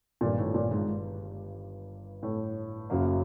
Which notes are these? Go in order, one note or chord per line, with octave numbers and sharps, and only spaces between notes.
G1 G2 A#2 D#3 G3
A2
A#2
G#2
A2
F#1 F#2 C#3 F#3 A#3